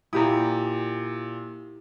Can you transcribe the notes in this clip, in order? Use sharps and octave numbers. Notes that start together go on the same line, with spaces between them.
A#2 E4 G4 A#5 D#6